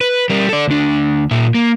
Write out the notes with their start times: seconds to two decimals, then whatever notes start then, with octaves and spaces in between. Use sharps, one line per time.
0.01 B4
0.30 G3 A#4
0.49 A4 D5
0.68 D2 D4
1.31 A#2 E5
1.55 A#3